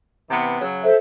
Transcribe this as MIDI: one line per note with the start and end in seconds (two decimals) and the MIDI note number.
0.30 0.59 48
0.30 0.59 52
0.30 0.59 59
0.61 0.86 49
0.61 0.86 54
0.83 0.95 69
0.83 0.95 72
0.83 0.95 76